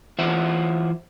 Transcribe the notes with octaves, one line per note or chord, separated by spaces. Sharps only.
E3 F4 C5 E5 F#5